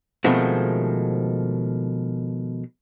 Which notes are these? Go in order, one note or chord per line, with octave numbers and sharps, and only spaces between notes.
B2 D#3 F3 G#3 A3 C4